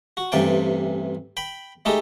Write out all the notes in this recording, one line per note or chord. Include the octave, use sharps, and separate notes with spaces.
F#4
A1 G2 C3 E3 D5 G5
G5 B5
G#3 A3 D#4 G4 A4